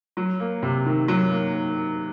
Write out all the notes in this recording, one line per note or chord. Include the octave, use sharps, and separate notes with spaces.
F#3
A#3
C3
D#3
F#3
A#3